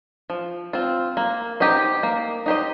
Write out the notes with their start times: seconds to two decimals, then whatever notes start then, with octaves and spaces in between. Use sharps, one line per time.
0.30 F3
0.73 C4 F4
1.17 A#3
1.60 D#4 G4 C5 D#5
2.03 A#3
2.46 D#4 G4 C5 D#5